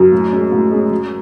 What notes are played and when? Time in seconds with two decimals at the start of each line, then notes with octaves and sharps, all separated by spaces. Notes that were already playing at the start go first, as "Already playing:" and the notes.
Already playing: F#2
0.12 A2
0.33 G#3 C#4
0.52 A2
0.71 G#3 C#4
0.91 F#3